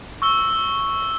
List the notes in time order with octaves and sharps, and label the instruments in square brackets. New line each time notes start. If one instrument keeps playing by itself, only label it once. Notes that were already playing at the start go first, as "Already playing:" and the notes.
[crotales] C#6 E6 G7